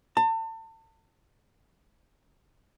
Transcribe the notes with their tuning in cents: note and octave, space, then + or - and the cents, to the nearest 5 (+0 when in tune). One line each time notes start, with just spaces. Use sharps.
A5 +35